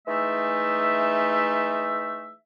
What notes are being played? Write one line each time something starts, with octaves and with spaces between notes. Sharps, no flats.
E3 G#3 A3 D#4 E5